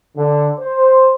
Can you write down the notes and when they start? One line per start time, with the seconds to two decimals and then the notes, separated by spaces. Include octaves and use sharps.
0.16 D3
0.60 C5